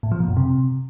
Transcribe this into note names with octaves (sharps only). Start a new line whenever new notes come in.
A2
F3
A#2
F#2
C3